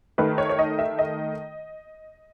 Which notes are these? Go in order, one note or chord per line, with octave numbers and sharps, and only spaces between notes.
D#3 A3 B4
C#5
C#5
D#5
E5
D#5